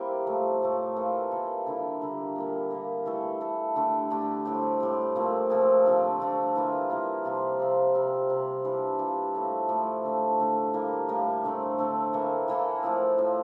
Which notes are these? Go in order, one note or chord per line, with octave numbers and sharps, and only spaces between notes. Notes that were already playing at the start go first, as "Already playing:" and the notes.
Already playing: G3 A#3 C4 E4 G4
A2 F3 A3
A2 F3 A3
E3 A#3 F4 A4
E3 A#3 F4 A4
D3 G3 A#3 E4
D3 G3 A#3 E4
A#2 G3 A#3
A#2 G3 A#3
E3 A3 E4 A4
E3 A3 E4 A4
D3 A3 D4 G4
D3 A3 D4 G4
A2 G3 C4 G4
A2 G3 C4 G4
A#2 F3 A3 C4
A#2 F3 A3 C4
D3 F3 A3 D4
D3 F3 A3 D4
E3 G3 A#3 F4
E3 G3 A#3 F4
C3 F3 C4 F4
C3 F3 C4 F4
C3 G3 C4
C3 G3 C4
E3 G3 D4 F4
E3 G3 D4 F4
A2 F3 A3 E4
A2 F3 A3 E4
D3 A3 D4
D3 A3 D4
A2 G3 A#3
A2 G3 A#3
D3 A3 C4
D3 A3 C4
E3 A#3 E4 A4
E3 A#3 E4 A4
A2 F3 C4
A2 F3 C4